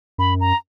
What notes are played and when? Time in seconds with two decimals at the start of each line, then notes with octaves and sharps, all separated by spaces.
0.18 F#2 B5
0.41 A#5